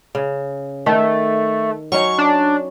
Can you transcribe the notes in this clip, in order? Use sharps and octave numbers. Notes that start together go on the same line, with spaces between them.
C#3
D#3 A3
F#3 C#4 D#4 C#6
D4